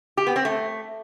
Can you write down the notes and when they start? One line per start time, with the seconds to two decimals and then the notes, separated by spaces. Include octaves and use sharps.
0.17 G4
0.27 B3
0.36 C4
0.45 A3